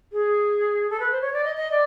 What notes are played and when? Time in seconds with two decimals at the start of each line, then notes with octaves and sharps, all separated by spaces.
0.12 G#4
0.89 A4
0.99 B4
1.11 C5
1.21 C#5
1.33 D5
1.44 D#5
1.55 D#5
1.71 D5